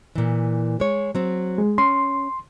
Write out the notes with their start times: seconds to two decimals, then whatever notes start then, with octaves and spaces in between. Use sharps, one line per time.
0.15 A#2 E3
0.80 G#3 C#5
1.15 F#3 C4
1.58 G#3
1.78 C#4 C6